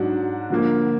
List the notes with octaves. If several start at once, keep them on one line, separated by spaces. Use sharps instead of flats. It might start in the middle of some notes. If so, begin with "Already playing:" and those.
Already playing: G#2 F#3 D4 F#4
D3 F3 A#3